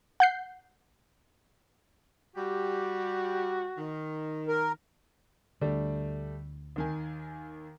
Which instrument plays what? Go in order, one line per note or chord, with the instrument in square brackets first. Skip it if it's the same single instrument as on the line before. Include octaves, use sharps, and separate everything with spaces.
[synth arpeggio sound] F#5 G6 C7
[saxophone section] G3 G4 [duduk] F#4
[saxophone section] D#3
[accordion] A#4
[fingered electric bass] D2 D3 [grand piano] G3 A3 D4
[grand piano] D#2 D#3 G#5